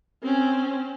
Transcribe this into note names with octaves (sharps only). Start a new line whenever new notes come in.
C4 C#4